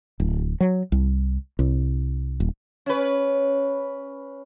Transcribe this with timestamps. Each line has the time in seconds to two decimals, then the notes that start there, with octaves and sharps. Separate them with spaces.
0.20 D1
0.60 F#3
0.92 C2
1.59 C2
2.40 D#1
2.86 C#4 B4